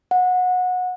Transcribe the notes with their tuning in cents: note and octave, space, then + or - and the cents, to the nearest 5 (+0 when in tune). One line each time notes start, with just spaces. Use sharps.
F#5 -20